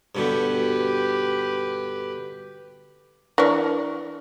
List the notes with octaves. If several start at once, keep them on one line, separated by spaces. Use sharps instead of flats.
G2 B2 D3 G4 B4
E3 D4 A#4 C#6